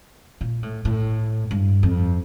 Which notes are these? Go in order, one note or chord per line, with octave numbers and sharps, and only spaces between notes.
A#2
A2
A2
G2
F2